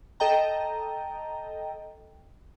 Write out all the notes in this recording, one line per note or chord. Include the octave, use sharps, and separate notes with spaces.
A4 D#5 G5 A#5